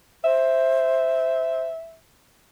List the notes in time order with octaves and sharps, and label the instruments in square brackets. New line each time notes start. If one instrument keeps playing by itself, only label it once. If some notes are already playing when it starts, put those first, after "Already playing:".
[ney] C5 [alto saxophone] E5